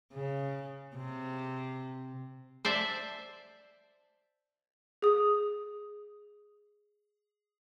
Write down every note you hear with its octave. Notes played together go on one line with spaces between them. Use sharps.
C#3
C3
C5 D5 E5 A5
G#4 D#6